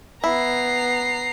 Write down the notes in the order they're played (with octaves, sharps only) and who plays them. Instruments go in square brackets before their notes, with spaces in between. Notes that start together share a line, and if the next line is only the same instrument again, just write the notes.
[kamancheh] B3 [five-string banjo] E4 [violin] A#5 C7